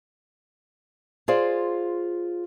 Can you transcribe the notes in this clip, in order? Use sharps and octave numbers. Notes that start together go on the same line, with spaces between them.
F4 G#4 C5 D5 F5